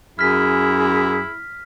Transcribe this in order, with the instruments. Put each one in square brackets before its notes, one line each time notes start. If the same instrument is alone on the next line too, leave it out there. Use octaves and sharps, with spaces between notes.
[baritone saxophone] F#2 [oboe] E4 [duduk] G#4 [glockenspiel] F6 B6